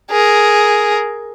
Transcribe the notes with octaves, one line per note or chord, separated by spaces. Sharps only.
G#4 A#4